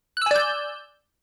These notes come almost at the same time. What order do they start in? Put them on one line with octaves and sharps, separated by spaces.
F#6 E6 G#5 D5 G6